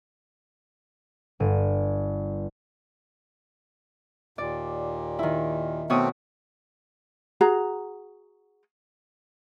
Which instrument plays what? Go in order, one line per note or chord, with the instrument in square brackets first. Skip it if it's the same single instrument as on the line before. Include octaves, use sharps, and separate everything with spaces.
[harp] G1 D#7
[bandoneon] D#2 A#2 [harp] D5
[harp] D#3 E4
[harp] B2 C#5 D#6 [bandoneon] A3 C4
[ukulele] F#4 G#4 A#5